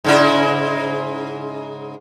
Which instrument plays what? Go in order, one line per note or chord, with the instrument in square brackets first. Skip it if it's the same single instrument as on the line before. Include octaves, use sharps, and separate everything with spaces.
[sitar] G#2 C#3 E4